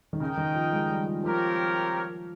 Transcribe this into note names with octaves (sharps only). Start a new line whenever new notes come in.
D#3
C#3 D#4 A#4 D#5 G5
D#3
F3
G#3
G3
F3
F3 C4 G4 A#4 C#5 F5